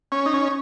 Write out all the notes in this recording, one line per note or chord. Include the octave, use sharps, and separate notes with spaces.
C#4
D#4
C#4